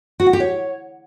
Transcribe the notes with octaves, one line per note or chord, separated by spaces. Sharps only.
F#4
F#5
G4
C#5